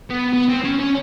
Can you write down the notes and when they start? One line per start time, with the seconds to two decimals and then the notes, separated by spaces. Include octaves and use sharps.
0.10 B3
0.33 B3
0.48 C4
0.64 C#4
0.79 C#4